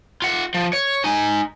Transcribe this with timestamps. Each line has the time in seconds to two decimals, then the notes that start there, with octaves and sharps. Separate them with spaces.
0.22 F4 F#5
0.54 F3
0.73 C#5
1.04 D#4 G#5